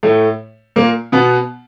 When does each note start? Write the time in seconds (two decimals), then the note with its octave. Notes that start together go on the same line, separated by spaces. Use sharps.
0.03 A2 A3
0.76 A#2 A#3
1.12 B2 B3